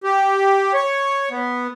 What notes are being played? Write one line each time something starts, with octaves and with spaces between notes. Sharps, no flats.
G4
C#5
B3